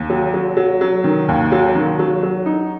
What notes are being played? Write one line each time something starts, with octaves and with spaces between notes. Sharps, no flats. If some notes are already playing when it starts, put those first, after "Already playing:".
Already playing: D#2
F#3
F#3
F#3
F#3
D#3
D#2
F#3
D#3
F#3
F#3
D#4